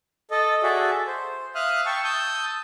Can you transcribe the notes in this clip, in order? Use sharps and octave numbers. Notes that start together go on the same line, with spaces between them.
A4 D#5
F#4 G#4 A4 D5 E5
C5
E5 F5 D#6 F6 F#6
G5 A5 C#6 E6
A5 D#6 E6 G6